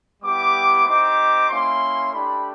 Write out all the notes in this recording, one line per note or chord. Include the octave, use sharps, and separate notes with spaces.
G3 B3 E4 G4 D6
C4 D#4 G4 D6
A#3 C#4 E4 C6
A3 D4 G4 B5